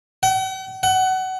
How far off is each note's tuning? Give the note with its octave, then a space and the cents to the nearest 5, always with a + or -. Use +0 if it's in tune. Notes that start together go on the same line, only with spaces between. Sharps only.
F#5 +45
F#5 +25